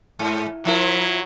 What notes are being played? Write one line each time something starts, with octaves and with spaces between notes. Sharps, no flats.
G#2
F3 F#3 E4 A#4